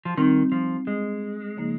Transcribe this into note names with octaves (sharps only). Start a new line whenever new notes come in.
F3
D#3 G3 C4 D#4
F3
G#3
C#3 F3 A#3 D#4